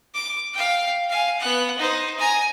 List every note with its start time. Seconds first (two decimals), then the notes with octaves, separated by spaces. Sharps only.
0.14 D6
0.53 F5 G5
1.10 F5 G#5
1.40 B3 F#5
1.78 D#4 C5
2.19 G#5 A#5